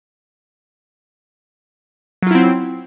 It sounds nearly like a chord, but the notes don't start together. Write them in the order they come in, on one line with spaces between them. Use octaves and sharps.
F#3 F4 E4 C4